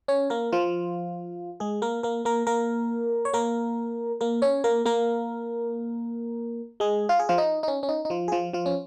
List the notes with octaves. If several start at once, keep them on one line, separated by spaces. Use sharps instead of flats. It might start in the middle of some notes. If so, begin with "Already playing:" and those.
C#4 C#5
A#3 A#4
F3 F4
G#3 G#4
A#3 A#4
A#3 A#4
A#3 A#4
A#3 A#4
C#5
A#3 A#4
A#3 A#4
C#4 C#5
A#3 A#4
A#3 A#4
G#3 G#4
F4
G#4
F3 F4
D#4
D#4
C#4
C#4
D#4
D#4
F3 F4
G#4
F3 F4
F3 F4
C#4